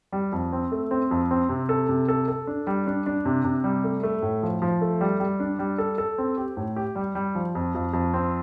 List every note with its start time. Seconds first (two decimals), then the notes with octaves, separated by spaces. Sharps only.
0.12 G3
0.32 F2
0.52 C4
0.72 A3
0.91 C4
1.11 F2
1.31 C4
1.49 C3
1.69 A4
1.89 C3
2.09 A4
2.28 A4
2.47 D4
2.67 G3
2.87 D4
3.06 D4
3.25 C3
3.44 C3
3.64 G3
3.84 A3
4.03 A3
4.22 A2
4.43 F3
4.62 F3
4.81 A3
5.01 G3
5.20 G3
5.40 D4
5.59 G3
5.78 A4
5.98 A4
6.18 C4
6.37 G4
6.57 A2
6.76 G4
6.96 G3
7.15 G3
7.35 F3
7.55 F2
7.75 F2
7.93 F2
8.14 C4